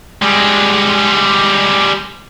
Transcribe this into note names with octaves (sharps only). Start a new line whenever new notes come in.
G3 G#3